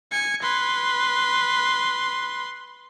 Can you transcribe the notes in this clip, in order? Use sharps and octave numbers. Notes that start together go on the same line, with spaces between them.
G#5 C#7
B4 C6